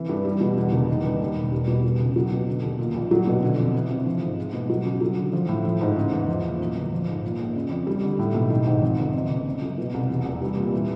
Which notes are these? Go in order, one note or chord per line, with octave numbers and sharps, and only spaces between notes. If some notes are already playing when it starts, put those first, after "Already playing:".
Already playing: C3 E3
G2
G3
B2
E2
F#1
D#3
G2
D#2
E1
G3
B2
B2
C#2
F#3
B2
D3
D#2
A#2
A#1
F#3
B2
D3
F2
E3
C3
F3
G#2
G#3
B2
F#3
C#3
F#3
D3
F3
A2
F3
G#2
C#3
E2
F3
A#2
F#2
G1
F3
G#2
A#2
A#1
C#3
F2
G3
D3
A2
B1
D#3
G#2
F2
G1
F2
F#1
C#3
F#2
B2
C2
E2
F1
G3
A#2
E3